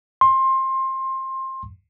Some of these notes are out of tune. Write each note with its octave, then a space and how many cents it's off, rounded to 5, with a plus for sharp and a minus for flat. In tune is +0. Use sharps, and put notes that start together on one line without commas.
C6 +20